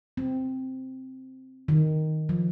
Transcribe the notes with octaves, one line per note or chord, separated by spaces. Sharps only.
C4
D#3
F3